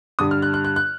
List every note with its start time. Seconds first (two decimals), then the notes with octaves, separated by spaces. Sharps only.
0.19 G2 D3 G3 D#6
0.31 F6
0.42 F#6
0.54 F#6
0.65 F#6
0.76 F#6